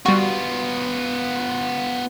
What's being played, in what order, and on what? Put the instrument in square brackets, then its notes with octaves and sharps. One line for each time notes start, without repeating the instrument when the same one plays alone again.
[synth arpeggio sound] G3 F#4 [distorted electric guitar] B3 F4